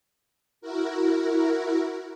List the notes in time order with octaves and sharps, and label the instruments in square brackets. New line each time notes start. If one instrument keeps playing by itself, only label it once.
[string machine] E4 F#4 A#4